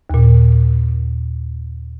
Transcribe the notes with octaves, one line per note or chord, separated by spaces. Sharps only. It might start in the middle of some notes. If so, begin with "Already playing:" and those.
D#2 A#2